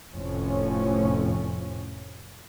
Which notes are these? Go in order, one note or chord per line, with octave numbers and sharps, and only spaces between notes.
F1 F2 A2 F3 C#4